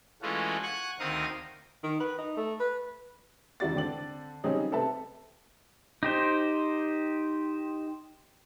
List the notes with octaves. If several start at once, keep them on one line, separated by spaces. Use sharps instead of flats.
E3 G#3 A3 C#4 F4 F#4
F#5 G#5 C#6 F#6
D2 D#3 C4 A#4 F5 D#6
D#3
B4
D#4
A3
B4
E1 C#3 E4 F#4 D5 A6
D3 C4 D5 F#7
C#3 F#3 G3 C4 D#4 G#4
C3 C4 A4 B4 E5 A5
D#4 G4 C5